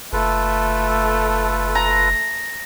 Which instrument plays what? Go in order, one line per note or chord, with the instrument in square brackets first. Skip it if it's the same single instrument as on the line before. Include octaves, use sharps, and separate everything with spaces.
[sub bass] F#1 [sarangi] A3 [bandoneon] F4 A4 B4
[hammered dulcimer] A#5